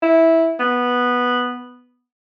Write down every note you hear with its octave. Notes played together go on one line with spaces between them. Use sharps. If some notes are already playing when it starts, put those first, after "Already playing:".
E4
B3